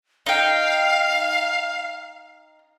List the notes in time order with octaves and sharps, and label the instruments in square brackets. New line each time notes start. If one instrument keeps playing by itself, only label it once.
[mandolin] D#4 G5 [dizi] F5